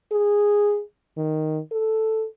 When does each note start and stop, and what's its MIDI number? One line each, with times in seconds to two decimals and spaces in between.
0.12 0.81 68
1.17 1.60 51
1.72 2.26 69